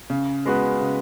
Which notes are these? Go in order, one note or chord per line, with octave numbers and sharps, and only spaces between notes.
C#3
G#3 B3 F#4 B4
C#3